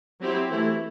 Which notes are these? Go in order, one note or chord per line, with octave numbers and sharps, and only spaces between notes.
F#3 C4 E4 G4 C5
E3 A3 E4